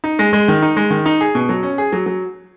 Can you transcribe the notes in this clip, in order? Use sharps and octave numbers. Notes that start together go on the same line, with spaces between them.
D#4
G#3
G#3
D#3
D#4
G#3
D#3
D#4
G#4
B2
F#3
C#4
G#4
F#3
F#3